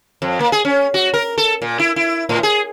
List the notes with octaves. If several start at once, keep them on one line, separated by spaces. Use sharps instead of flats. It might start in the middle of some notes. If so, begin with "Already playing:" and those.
F2
A#3
G#4
C#4
F#4
A#4
A4
A#2
E4
E4
A2
G#4